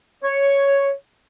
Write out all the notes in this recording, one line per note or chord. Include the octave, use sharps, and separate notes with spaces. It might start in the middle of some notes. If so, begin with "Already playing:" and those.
C#5